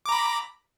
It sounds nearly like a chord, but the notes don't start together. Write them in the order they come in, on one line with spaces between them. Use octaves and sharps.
D6 A#5 B5